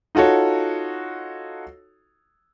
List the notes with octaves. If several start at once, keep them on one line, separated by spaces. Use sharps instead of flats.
D#4 F4 F#4 A4 C#5